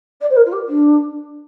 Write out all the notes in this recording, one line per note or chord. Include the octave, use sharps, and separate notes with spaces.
D5
C5
A#4
F4
G4
D4